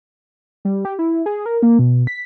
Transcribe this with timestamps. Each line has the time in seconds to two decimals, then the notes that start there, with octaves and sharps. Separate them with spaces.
0.65 G3
0.85 G4
0.99 E4
1.26 G#4
1.46 A#4
1.63 A#3
1.79 B2
2.07 B6